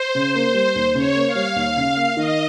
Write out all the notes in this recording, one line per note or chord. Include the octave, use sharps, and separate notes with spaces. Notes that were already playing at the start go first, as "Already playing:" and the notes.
Already playing: C5
C#3
A#3
G3
D#2
C#3 C#5
A#3
F5
G3
D#2
C#3
A#3
D#3 D#5